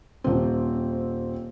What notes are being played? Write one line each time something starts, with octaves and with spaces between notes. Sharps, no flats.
D#1 C4